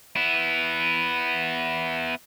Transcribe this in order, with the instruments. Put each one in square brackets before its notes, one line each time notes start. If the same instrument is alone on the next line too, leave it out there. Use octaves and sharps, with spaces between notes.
[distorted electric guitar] B3 E4